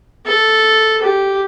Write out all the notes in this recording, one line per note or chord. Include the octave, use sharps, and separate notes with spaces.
A4
G4